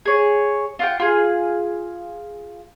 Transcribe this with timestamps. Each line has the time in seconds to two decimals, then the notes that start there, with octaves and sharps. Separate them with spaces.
0.05 G#4 C#5
0.79 F4 F#5 G5
1.00 F4 G#4